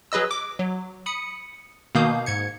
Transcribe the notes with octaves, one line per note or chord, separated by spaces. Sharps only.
F#3 G#4 B4 D#5 E6
D6
F#3
B5 D#6 C#7
B2 D#3 A#3 F5 D#6 G6
G#2 G#6 C#7